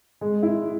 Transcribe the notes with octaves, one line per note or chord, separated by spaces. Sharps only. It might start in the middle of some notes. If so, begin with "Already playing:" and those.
G#3
E4